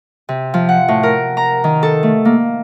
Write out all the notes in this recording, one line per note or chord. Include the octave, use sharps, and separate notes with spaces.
C3
F3
F#5
A2
A#4
A#5
D#3
A4
A3
A#3